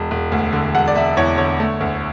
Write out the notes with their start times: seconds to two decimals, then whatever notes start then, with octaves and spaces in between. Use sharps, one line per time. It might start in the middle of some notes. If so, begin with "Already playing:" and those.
Already playing: E1
0.11 E1
0.32 D2
0.53 D3
0.75 E1 F#5
0.88 D5
0.96 E1 E5
1.17 E2 C#5
1.38 D3 C#5
1.60 A3
1.81 D2